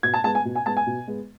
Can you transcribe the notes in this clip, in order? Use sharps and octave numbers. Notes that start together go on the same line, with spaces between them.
B2 G#6
A5
G#3 B3 A5
G#5
B2
G#5
G#3 B3 A5
G#5
B2
G#3 B3